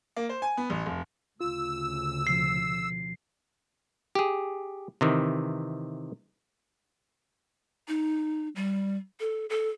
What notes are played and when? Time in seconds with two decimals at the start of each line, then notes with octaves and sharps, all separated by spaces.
0.17 A#3
0.29 C5
0.42 G#5
0.57 B3
0.70 A1
0.86 F1
1.41 D2 C#3 F4 E6
2.27 B2 F3 C7
4.15 G4 G#4
5.01 C3 D#3 E3
7.88 D#4
8.56 G3
9.20 A4
9.50 A4